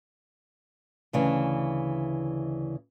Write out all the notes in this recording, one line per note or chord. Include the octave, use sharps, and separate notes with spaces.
D2 C#3 E3